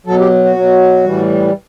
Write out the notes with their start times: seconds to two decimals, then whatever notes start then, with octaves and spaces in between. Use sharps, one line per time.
0.06 B2 F#3 A4
0.19 G4
0.44 F#4
0.56 B2 F#3
1.04 A2 E3 G3